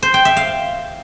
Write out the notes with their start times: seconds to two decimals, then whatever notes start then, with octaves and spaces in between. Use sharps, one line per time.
0.02 C5
0.14 G5
0.25 E5
0.37 F5